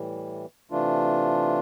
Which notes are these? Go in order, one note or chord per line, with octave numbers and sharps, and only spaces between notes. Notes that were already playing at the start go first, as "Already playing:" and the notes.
Already playing: A2 E3 G3
C3 E3 A3 D4 F4